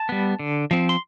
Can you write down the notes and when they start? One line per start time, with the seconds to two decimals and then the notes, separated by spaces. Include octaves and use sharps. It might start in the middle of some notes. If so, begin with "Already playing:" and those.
Already playing: A5
0.09 G3 B3
0.39 D3
0.71 F3 C4
0.89 C6